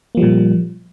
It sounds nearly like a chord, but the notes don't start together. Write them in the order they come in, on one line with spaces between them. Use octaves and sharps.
A#3 F3 G3 A#2